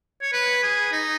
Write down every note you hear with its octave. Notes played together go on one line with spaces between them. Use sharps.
C#5
B4
G#4
D#4